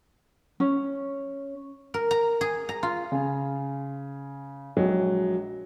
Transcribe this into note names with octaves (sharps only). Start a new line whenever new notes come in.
C#4
A#4
A#5
G#4
A#5
F4
C#3 G#5
A#1 F#3 G#3 D#5